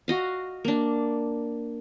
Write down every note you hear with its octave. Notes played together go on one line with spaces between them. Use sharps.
F#4 D#5 F5
A#3 D4